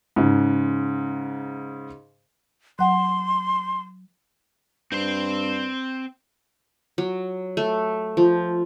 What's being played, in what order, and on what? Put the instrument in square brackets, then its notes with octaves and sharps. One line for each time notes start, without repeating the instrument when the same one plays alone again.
[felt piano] G#2 C#3
[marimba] F#3 F#5 [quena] C6
[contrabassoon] G2 [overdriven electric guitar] C4 C5
[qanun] F#3
A3
F3